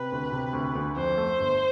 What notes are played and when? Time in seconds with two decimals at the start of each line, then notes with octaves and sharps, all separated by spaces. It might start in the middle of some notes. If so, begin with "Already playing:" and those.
Already playing: C3 B4
0.12 D2
0.32 C3
0.53 D2
0.75 D2
0.96 F2 C5
1.18 A3
1.39 G1